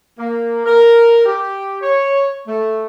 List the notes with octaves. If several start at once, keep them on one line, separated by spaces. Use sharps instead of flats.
A#3
A#4
G4
C#5
A3